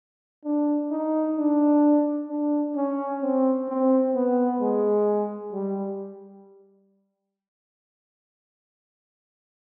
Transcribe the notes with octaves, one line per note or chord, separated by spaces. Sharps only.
D4
D#4
D4
D4
C#4
C4
C4
B3
G#3
G3